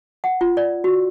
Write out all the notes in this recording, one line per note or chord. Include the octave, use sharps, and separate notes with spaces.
F#5
F4
D5
F#4